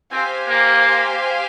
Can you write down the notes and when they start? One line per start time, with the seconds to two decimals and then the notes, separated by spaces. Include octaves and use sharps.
0.11 C4 G4 C5 F5 G#5
0.49 A#3